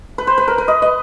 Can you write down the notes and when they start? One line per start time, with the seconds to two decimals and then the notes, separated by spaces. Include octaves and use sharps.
0.18 B4
0.27 C5
0.38 B4
0.48 A#4
0.58 B4
0.68 D#5
0.82 D#5